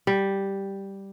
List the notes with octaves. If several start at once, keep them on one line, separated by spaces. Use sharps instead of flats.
G3